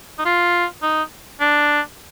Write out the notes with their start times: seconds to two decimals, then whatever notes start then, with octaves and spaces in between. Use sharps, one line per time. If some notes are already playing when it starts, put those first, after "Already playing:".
0.19 D#4
0.25 F4
0.83 D#4
1.40 D4